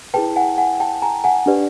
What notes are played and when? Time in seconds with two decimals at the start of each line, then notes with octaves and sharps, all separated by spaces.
0.14 E4 G#4 B4 G5 A5
0.36 F#5 G#5
0.58 F#5 G#5
0.80 G5 A5
1.02 G#5 A#5
1.24 F#5 G#5
1.46 D4 G4 B4 D5